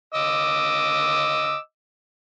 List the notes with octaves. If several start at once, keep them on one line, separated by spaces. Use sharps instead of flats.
D#5 D6 E6